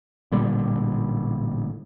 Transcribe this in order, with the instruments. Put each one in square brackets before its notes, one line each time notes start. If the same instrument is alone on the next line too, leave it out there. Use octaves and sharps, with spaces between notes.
[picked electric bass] A1 A#2 D3 G3